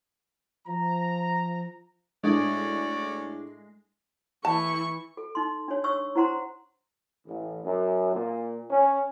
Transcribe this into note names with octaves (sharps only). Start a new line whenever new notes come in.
F3 A#5
A2 G#3 C#4 D4 F#4 D5
E3 A5 C#6
A4
D#4 C6
D4 C#5
C#5 C#6 E6
E4 C5 F#5 A#5 C6
A1
F#2
A#2
C#4